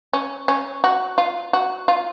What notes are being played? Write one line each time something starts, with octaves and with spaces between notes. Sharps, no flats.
C#4
C#4
F#4
F4
F#4
F4